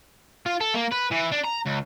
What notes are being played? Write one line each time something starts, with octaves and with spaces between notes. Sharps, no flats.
F4
A4
A#3
B4
E3
D4
A#5
C#2